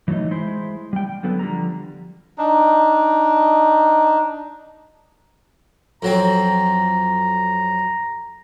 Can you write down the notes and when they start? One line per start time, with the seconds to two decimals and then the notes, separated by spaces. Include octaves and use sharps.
0.08 E3 F#3 A3 D#4 D#5
0.31 G#3 E4 C5
0.93 G3 G5
1.23 D3 F#3 B3 A4 B4
1.39 D3 F3 G3 A#5
2.38 D4 D#4
6.02 F2 F#3 C4 A#5